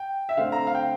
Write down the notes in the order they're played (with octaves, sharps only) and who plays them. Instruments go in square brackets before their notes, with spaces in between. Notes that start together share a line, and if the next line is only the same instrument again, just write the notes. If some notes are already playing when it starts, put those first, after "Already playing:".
Already playing: [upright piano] G5
E5
D3 A3 C4 F5
A#5
F5
G5